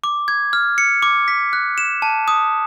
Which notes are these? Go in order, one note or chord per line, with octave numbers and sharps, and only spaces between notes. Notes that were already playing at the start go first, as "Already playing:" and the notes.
D6
G#6
F6
C#7
D6
B6
F#6
E7
A5
D#6